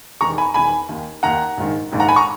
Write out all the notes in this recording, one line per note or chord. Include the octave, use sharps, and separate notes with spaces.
E1 E2 D#3 A#5 C#6
G#5 B5
E1 E2 D#3 G#5 B5
D#2 D#3
D#2 D#3 F#5 A#5
A#1 G#2 D#3
A#1 G#2 D#3
F#5 A#5
G#5 B5
A#5 C#6